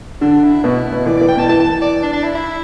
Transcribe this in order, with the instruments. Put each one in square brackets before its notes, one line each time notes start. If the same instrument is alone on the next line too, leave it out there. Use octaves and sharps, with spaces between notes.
[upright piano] D3 [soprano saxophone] D4
[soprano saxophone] E4
[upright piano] B2 [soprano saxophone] E4
[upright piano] B2
[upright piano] E3 [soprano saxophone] D5
[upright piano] E3 [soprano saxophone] D5
[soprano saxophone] G5
[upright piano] B2 [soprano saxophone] A5
[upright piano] E3 [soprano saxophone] A5
[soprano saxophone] A5
D5
D4
D4
E4
E4